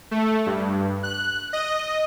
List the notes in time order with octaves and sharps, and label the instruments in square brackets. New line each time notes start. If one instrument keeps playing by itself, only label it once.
[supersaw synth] A3
G2
F#6
D#5